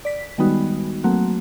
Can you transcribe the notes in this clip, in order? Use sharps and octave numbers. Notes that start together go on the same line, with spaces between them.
D5 B6
D#3 G3 G#3 B3 D#4 F#4
F#3 A3 A#3 C4 F#4